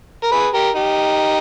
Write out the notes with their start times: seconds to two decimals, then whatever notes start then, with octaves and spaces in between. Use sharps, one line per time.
0.24 A#4
0.32 G#4 B4
0.54 G4 A#4
0.75 D#4 G4